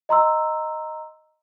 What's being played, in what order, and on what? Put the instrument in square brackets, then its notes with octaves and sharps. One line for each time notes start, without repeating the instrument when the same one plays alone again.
[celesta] D#5 A#5 C6 E6